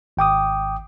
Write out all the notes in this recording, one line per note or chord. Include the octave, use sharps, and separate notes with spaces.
G#1 G5 D6 D#6